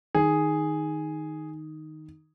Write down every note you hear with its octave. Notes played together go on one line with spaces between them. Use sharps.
D#3 G#4